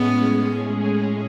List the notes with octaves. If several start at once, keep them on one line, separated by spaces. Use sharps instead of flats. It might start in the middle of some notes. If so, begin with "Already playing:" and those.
Already playing: A2 G#3 B3 C#4 G#4